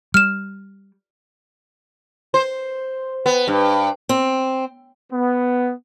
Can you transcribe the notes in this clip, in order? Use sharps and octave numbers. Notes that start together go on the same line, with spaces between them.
G3 F6 E7
C5
B3
G2
C4
B3